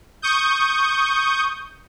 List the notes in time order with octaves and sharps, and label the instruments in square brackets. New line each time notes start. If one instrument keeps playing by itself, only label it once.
[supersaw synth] C#6 D#6 G6